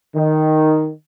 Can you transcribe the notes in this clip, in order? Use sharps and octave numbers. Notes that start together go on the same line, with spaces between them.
D#3